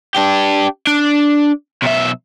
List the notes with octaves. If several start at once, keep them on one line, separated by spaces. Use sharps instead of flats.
D4 G4
D4
B1 E5